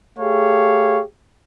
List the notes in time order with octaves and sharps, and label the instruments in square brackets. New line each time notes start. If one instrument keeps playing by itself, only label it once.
[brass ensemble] A3 G4 G#4 C#5 F5